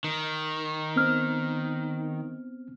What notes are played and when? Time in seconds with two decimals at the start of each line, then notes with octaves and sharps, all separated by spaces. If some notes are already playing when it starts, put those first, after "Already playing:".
0.04 D#3
0.96 B3 C4 F6